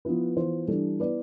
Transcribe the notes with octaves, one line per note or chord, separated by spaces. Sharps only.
F3 B3 E4 B4
E3 B3 F4 C5
E3 G3 D4 A4
B3 E4 B4 D5